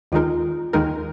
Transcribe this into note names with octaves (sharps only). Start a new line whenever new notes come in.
D#2 D#3 G#3 D#4 F4 A#4
D#2 D#3 G#3 D#4 A#4